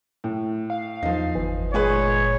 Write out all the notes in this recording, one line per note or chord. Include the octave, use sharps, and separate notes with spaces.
A2
F5
E2 F3 D#4
G1 E3
A#2 G#3 G#4 B4 C#5